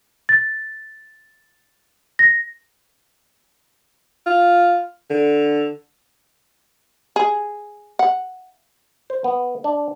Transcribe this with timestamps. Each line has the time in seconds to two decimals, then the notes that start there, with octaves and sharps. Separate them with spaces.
0.29 A6
2.19 A#6
4.26 F4
5.10 D3
7.16 G#4
7.99 F#5
9.10 C5
9.24 B3
9.64 D4